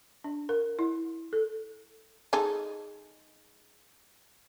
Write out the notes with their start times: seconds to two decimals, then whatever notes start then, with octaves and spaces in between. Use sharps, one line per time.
0.24 D4
0.49 A#4
0.79 E4
1.33 A4
2.33 G#3 D#4 A4